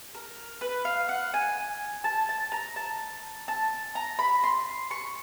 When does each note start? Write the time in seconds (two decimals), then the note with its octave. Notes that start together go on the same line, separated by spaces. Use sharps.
0.15 A#4
0.61 B4
0.85 F5
1.09 F#5
1.34 G#5
2.04 A5
2.29 A5
2.52 A#5
2.76 A5
3.48 A5
3.95 A#5
4.19 B5
4.44 C6
4.91 C#6